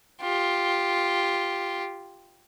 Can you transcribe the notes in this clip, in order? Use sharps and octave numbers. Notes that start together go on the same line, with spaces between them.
F4 G4